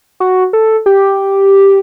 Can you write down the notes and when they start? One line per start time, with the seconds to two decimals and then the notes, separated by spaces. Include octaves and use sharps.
0.20 F#4
0.53 A4
0.86 G4